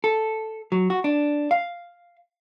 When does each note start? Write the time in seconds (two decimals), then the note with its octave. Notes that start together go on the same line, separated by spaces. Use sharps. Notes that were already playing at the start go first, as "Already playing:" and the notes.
0.04 A4
0.72 F#3
0.90 F#4
1.04 D4
1.51 F5